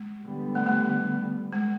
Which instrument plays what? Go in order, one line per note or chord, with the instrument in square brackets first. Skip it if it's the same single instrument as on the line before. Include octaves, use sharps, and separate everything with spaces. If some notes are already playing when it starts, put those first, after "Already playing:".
Already playing: [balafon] G#3
[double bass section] D3 G3 B3
[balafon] A3
A3
G#3